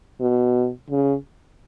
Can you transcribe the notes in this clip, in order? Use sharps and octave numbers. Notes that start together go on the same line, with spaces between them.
B2
C#3